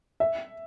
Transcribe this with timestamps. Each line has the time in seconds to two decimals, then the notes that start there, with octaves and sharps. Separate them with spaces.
0.20 E5